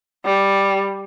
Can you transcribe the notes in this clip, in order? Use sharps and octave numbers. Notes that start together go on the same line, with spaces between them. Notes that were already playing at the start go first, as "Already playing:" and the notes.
G3